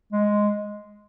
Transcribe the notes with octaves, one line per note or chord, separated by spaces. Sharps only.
G#3